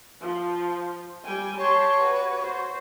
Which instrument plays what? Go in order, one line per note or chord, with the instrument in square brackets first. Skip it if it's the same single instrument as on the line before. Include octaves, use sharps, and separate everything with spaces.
[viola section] F3
G3 G5 G#5
[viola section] G4 A5 C6 [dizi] C#5
[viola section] F#4 B4
F#4 C5